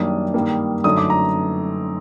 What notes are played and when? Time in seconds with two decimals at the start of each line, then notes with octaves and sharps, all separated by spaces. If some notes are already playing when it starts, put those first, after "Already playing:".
Already playing: F#2 D#3 G3 A#3 D4 D#6
0.34 G2 D#3 G3 A#3
0.84 F#2 D3 A3 D#4 D#6
0.98 D6
1.10 A#5